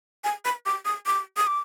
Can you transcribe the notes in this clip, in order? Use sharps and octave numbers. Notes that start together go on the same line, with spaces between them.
G#5
B5
D6
D#6
D6
D#6
D6